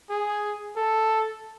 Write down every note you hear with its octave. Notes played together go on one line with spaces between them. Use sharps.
G#4
A4